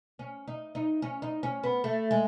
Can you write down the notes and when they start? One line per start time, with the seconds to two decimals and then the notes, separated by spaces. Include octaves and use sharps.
0.19 C#4
0.48 D#4
0.75 D#4
1.02 C#4
1.22 D#4
1.43 C#4
1.64 B3
1.84 A3
2.11 G#3